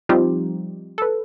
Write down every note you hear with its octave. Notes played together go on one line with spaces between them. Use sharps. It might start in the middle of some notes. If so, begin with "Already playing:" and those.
F3 G3 C4 D#4 F4 G4
A4 B4